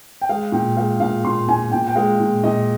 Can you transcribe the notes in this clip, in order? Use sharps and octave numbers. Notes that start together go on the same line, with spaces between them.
G5
G#3 F5
A#2 G5
G#3 F5
A#2 F5
A#2 C6
A#2 G#5
A#2 G5
G5
G#3 F5
A#2
A#2 D#5